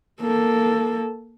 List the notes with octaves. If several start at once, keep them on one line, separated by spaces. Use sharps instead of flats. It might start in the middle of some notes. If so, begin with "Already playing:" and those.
A#3 A4